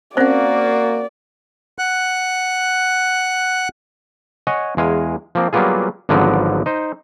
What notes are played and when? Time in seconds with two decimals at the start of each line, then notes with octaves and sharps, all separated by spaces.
0.17 A#3 C4 C#4 F#4 C5 D5 F#5
1.79 F#5 F#6
4.47 C#5 D#5 F#5 G#5
4.77 E2 G#3 F5 G#5
5.35 F3 A#3 C4
5.53 F#3 G3 A#3 B3 F4 G#4
6.09 G#1 D3 F3 F#3 B3 A#4
6.66 D#4 C5